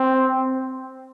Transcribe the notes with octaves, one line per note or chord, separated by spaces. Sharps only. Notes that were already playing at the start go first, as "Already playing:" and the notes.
Already playing: C4